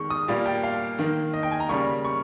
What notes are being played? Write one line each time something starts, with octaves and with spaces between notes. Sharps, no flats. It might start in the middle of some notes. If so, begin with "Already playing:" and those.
Already playing: D#3 G#3 C#6
D#6
A#2 G3 A#3
G5
F5
D#3 A#3
D#5
G5
G#5
A#5
C#3 G3 A#3 C#6
C#6